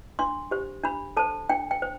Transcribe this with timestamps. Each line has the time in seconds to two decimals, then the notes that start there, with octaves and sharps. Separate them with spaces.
0.19 D4 C6
0.51 G4 C5
0.84 D4 B5
1.17 A4 C5 A5
1.49 D4 G5
1.71 G5
1.82 C5